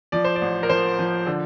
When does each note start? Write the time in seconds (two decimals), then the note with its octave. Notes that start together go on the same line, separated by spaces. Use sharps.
0.12 F3 D5
0.24 C5
0.36 D5
0.41 A1
0.63 A#4
0.69 F3 C5
0.99 F3
1.27 D3